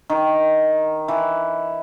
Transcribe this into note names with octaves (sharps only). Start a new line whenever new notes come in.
D#3
E3